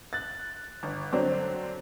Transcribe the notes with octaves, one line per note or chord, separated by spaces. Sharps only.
F#6 A6
G1
D3 F#3 C4 D4